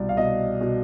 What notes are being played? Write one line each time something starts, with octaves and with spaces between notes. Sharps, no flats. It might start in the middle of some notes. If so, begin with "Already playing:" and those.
Already playing: C2 B2 D5
F5
B2 D#5
B2